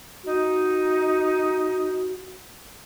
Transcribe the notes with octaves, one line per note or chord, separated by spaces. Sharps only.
D#4 F#4